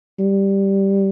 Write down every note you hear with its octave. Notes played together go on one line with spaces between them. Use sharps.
G3